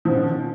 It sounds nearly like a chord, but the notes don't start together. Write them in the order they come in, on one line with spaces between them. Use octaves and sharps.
F3 B2 C#4 D#3